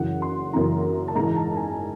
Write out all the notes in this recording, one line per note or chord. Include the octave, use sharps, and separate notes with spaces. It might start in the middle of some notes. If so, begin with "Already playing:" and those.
Already playing: F#2 C#3 E3 F#5
C6
F#2 C#3 E3 A#5
A5
G#2 E3 A#5
A5
G#5